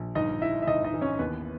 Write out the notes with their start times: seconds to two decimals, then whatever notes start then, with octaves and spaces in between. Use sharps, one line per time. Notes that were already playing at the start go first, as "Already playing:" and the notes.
Already playing: A#1
0.15 G1 D#4 D#5
0.41 G2 E4 E5
0.62 E5
0.67 G1 D#4 D#5
0.84 D#4 D#5
0.94 E3
1.01 C#4 C#5
1.19 D#2 B3 B4